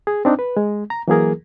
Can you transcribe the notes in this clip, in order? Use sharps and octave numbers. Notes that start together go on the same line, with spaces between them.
G#4
C4 D4 D#4
B4
G#3
A#5
E3 F#3 A#3 G#4 A#4